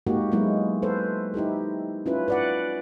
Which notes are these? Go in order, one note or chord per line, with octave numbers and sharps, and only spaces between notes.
G#3 A#3 D#4 F#4 G4
F#3 G#3 A#3 B3 E4
A4 B4 C5
D#4 E4 G4 A4
C#4 E4 F4 B4
B4 D5 F#5